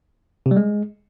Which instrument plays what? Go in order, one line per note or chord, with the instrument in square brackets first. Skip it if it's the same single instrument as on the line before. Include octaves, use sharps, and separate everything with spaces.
[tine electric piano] C3
G3
G#3